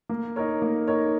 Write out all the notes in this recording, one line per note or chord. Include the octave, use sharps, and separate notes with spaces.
A#3
D#4 A#4 C#5
A#3
D#4 A#4 C#5